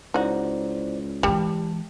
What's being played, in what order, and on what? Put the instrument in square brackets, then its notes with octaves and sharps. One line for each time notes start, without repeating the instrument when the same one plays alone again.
[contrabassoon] C#2 [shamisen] D#4 F#4 [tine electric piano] E4 C5 D5
[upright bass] E3 G#3 [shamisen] G3 [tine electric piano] A5